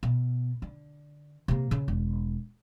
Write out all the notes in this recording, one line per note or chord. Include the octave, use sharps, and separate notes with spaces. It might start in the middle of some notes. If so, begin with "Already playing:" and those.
B2
D3
C3 A#3
C#3
E1